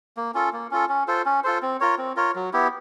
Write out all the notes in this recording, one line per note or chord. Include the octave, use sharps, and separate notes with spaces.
A#3
C#4 F4 A4
A#3
C#4 F4 A4
C#4
F4 A4 C5
C#4
F4 A4 C5
C4
F4 A#4 C#5
C4
F4 A#4 C#5
F#3
B3 E4 G4